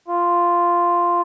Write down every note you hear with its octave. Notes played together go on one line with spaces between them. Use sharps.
F4